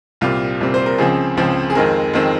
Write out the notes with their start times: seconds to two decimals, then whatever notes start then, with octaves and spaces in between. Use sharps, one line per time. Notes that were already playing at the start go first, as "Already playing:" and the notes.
0.21 C2 A#2 G3 C4 F4
0.60 C2 A#2 G3 C4
0.74 C5
0.86 A#4
0.98 C#2 C#3 F3 C4 G#4
1.37 C#2 C#3 F3 C4
1.70 G#4
1.75 F2 D#3 G#3 C4 A#4
2.14 F2 D#3 G#3 C4